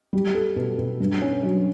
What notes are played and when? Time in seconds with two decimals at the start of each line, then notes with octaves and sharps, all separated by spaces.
0.13 G3
0.35 A4
0.56 B2
0.78 B2
1.00 G2
1.22 C#4
1.43 F#3